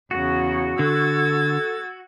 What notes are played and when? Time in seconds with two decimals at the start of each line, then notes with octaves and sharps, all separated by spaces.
0.11 E2 C#3 F#4
0.79 D3 A4 E6 G#6 A6